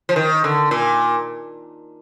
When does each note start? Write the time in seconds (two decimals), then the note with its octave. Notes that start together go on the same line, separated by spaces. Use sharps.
0.09 F3
0.16 D#3
0.44 D3
0.71 A#2